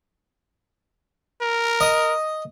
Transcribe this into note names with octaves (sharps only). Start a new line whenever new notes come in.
A#4
D#5